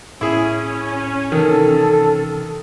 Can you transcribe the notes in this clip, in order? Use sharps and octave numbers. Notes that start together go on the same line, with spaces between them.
A2 C#4 E4 G#4
C3 D#3 E3 A4